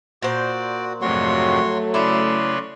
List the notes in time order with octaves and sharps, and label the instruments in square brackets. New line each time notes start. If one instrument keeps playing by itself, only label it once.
[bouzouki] A#2 C5 [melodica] F#4 [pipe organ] D5
[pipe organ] F2 G#2 C3 [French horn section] F#3 A3 [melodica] F#4 C#5 C6
[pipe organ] C#3 B4 C#5 [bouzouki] E4 [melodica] D5 C6